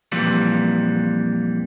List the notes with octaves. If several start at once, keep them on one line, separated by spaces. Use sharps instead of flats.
F2 A#2 E3 G3